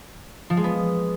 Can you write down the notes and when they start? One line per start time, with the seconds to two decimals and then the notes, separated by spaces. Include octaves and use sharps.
0.50 F3
0.57 G#3
0.64 B3